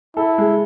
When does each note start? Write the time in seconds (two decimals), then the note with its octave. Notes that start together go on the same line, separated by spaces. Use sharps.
0.17 E4 A4
0.38 G#3